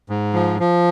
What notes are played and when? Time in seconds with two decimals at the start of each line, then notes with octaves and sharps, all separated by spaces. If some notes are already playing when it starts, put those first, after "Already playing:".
0.10 G#2
0.33 F3
0.60 F3